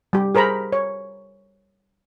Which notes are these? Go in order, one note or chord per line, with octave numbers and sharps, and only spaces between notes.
G3 G4
G#4 A#4 C5 A#5 B5
C#5